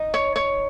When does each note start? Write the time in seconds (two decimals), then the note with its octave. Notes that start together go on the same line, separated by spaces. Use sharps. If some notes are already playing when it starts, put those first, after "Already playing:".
Already playing: D#4
0.14 C#5
0.36 C#5